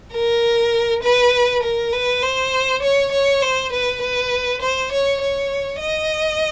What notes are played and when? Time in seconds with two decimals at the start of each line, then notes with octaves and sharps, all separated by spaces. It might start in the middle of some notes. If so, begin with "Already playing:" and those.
0.13 A#4
1.03 B4
1.63 A#4
1.93 B4
2.22 C5
2.82 C#5
3.12 C#5
3.42 C5
3.72 B4
4.01 B4
4.61 C5
4.92 C#5
5.21 C#5
5.81 D#5